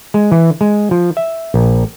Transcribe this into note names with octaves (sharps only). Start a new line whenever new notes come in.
G#3
E3
G#3
F3
E5
A#1